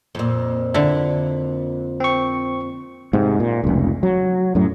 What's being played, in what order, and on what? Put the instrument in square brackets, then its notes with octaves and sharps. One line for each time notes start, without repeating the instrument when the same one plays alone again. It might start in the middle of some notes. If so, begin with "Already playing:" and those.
[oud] F2 A#2
[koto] D3 E4
[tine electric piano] C4 C#6
[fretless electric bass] G#2 C3
A#2
F1 C#2
F#3
F#2 A2 F#3